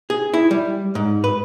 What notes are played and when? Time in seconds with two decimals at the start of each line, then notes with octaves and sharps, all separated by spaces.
0.10 G#4
0.34 E4
0.51 G3
0.95 G#2
1.24 B4